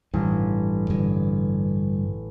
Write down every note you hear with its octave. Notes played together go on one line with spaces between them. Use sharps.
A1 G2
G2 D3